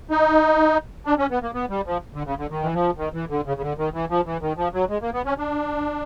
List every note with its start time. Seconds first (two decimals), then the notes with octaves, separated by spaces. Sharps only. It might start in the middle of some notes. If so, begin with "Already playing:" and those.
0.11 D#4
1.06 D4
1.18 C#4
1.31 B3
1.42 A#3
1.54 B3
1.70 G3
1.86 F3
2.15 D3
2.26 C#3
2.38 D3
2.51 D#3
2.64 E3
2.74 F3
2.98 D#3
3.14 E3
3.30 D3
3.46 C#3
3.57 C#3
3.62 D3
3.78 D#3
3.94 E3
4.10 F3
4.26 E3
4.42 D#3
4.57 F3
4.74 F#3
4.90 G#3
5.02 A#3
5.14 B3
5.26 C#4
5.38 D4